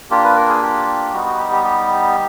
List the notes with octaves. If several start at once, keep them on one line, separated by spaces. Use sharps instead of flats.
A#3 D4 F4 G4
B4
A#4
G#4
G4
G3 B3 D#4 F#4
F#4
G4
G4
G4